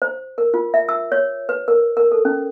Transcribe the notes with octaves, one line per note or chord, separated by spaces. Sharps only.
C5
A#4
F4
E5
E6
C#5
B4
A#4
A#4
A4
C#4